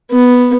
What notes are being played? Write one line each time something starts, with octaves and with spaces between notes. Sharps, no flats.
B3